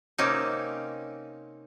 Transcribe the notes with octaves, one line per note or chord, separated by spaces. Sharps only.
C3 A#3 C4 C#4 D#4